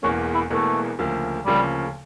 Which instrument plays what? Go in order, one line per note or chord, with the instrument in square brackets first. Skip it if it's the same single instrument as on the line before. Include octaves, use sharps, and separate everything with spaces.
[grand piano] E1 E2 E3 A#3 [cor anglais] C#4
[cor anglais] E4
[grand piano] E1 E2 E3 A#3 [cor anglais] A3
[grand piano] D2 C#3 F3 A#3
[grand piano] D2 C#3 F3 A#3 [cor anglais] G3